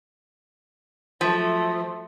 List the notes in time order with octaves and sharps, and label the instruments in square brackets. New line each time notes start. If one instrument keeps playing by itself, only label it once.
[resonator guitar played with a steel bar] F3 [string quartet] F#3 A3